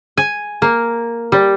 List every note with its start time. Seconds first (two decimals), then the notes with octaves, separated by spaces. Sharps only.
0.17 G#5
0.62 A#3
1.32 G3